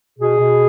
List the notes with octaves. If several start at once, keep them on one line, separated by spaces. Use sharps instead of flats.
B2 G#4
B2